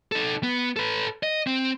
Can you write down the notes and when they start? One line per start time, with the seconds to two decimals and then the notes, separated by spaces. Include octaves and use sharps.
0.12 D#4 A4
0.43 B3
0.76 A4 B4
1.23 D#5
1.47 C4